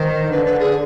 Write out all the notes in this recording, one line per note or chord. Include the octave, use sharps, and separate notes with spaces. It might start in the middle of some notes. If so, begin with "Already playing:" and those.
Already playing: D#3 C5
D3 B4
B4
G#4